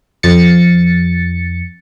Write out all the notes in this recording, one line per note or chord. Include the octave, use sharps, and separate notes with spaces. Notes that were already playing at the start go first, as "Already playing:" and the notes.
F2 A6 C#7